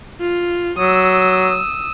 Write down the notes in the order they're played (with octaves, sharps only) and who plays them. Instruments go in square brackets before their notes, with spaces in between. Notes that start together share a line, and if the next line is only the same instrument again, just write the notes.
[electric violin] F4
[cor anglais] F#3 [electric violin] D#6 E6